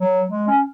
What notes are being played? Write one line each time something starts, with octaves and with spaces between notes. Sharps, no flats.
F#3
G#3
C#4